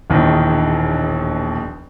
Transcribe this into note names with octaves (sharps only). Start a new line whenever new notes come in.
E1 A#1 D#2 D#3 E3